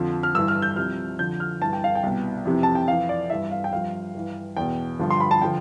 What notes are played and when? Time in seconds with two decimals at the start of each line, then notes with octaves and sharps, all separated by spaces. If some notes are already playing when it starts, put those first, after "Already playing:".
Already playing: F2 D3 F3
0.23 F6
0.35 G2 E3 E6
0.48 F6
0.62 G6
0.76 C2 C3 F3 F6
1.19 F2 D3 F3 G6
1.40 F6
1.61 G2 E3 A5
1.73 G5
1.84 F5
1.95 G5
2.03 C2 B2
2.45 F2 C3 E3
2.63 A5
2.75 G5
2.88 F2 E3 F5
3.09 D5
3.30 G2 E3 E5
3.52 F5
3.64 G5
3.73 G2 F3 F5
4.15 G2 E3
4.57 E2 B2 G5
4.99 G2 D3 F3
5.11 C6
5.20 B5
5.31 A5
5.42 D3 F3 G5